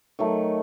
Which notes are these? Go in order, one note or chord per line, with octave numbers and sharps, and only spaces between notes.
D#3 F#3 A3